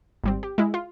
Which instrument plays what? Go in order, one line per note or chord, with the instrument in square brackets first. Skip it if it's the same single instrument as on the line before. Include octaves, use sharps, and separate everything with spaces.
[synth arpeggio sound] G#1 G3 C4
G4
G#3 E4
F4